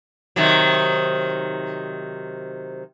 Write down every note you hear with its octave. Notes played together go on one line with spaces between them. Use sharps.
C3 D#3 F#3